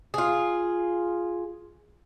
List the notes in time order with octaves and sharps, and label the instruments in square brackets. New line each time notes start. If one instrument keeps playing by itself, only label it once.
[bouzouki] F4 G#4